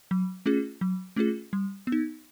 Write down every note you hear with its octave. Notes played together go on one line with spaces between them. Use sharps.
F#3
A3 C#4 F4 G#4
F#3
A3 C#4 F4 G#4
G3
B3
D#4